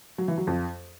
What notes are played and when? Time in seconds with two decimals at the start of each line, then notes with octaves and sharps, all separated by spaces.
0.18 F#3
0.28 E3
0.38 F#3
0.47 F2